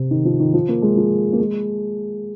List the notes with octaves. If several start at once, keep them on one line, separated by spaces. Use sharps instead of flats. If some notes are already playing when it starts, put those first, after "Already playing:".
Already playing: C3
D#3
F3
D#3
F3
A#3
G#3
F3
A#3
G#3